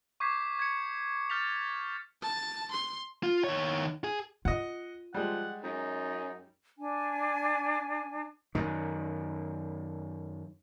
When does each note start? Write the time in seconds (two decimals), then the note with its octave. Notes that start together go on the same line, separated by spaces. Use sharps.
0.20 C#6 D6 G6 G#6 B6 C7
0.59 G#6 C#7
1.30 F6 G6 A6 B6 F7
2.21 A5
2.71 C6
3.23 F4
3.44 D#3 C#5
4.04 G#4
4.45 F4 D#5 F#5
5.14 F3 G3 G#3 F#5
5.63 F#2 D#4
6.78 D4 G#5
8.55 F#2 D#3